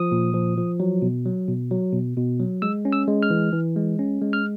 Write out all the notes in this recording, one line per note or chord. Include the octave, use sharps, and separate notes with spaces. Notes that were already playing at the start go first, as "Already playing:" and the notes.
Already playing: F3 D#6
A#2
F3
F3
F#3
B2
F#3
B2
F#3
B2
B2
F#3
G#3 E6
C#4
E6
G#3
F6
E3
E3
G#3
C#4
G#3
F6